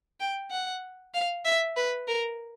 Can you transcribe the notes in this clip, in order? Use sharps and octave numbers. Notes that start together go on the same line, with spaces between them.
G5
F#5
F5
E5
B4
A#4